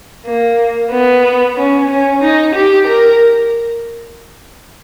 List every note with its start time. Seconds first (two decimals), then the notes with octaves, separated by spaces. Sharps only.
0.25 A#3
0.91 B3
1.57 C#4
1.89 C#4
2.22 D#4
2.55 G4
2.87 A#4